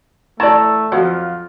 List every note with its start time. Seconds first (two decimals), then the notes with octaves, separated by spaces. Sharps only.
0.40 E3 A3 D5 A5 A#5 C#6
0.92 F2 F3 F#3 F4